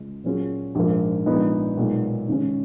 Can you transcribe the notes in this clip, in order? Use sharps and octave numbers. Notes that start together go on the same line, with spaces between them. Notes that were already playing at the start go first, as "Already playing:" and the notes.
Already playing: C#2 C#3 G#3
A#2 F#3 C#4 F4 G#4
A#1 G#2 F3 A#3
A#1 A#2 G#3 B3 D#4
B1 A#2 G#3 D#4
D#2 C#3 G#3 C#4